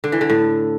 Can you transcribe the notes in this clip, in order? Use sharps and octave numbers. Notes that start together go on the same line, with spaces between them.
D3
E3
D3
A2